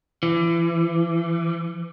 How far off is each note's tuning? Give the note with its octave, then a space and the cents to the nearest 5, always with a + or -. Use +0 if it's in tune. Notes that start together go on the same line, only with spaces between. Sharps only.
E3 +35